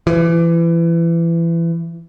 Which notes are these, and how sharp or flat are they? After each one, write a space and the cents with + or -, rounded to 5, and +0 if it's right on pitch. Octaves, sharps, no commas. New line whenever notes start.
E3 +25